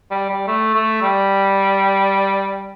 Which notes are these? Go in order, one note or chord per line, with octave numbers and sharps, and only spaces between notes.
G3
G3
A3
A3
G3